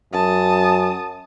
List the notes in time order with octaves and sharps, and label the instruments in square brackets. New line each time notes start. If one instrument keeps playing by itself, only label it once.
[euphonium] F#2 [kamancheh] A5 D#6